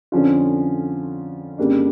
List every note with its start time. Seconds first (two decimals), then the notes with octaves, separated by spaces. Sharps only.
0.12 F2 D3 F3 C#4 F4
1.58 F2 C#3 G3 A#3 D4